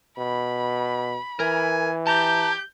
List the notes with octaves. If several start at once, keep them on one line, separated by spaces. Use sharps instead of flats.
B2 B5
E3 A#4 G#5
G4 A5 A#5 G6